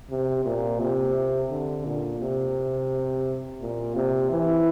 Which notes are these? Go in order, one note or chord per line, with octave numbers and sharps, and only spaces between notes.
C3
A#2
C3
D3
A#2
C3
A#2
C3
E3